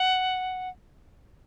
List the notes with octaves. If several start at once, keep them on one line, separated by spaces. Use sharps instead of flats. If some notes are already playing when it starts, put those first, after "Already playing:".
Already playing: F#5